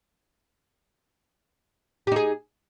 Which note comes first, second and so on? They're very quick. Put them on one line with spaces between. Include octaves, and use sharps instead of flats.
G4 D#4 G#4